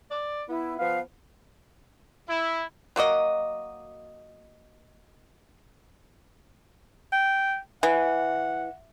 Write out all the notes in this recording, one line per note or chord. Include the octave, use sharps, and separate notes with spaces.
D5
B3 E4
F3 B3 B4 F5
E4
F#3 A#3 F#4 D#5
G5
E3 F#5